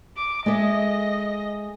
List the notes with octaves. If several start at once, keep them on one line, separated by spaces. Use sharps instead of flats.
D6
G#3 A4 D#5 E5